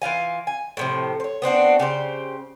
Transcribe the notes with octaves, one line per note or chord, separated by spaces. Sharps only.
E3 F4 F5 G#5
G#5
A2 C3 F3
C5 C#5
B3 C4 D4 F#4
C#3 G4 C5